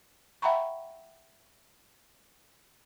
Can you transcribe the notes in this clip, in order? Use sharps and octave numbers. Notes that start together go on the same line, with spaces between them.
E5 F#5 G5 A#5 B5 C#6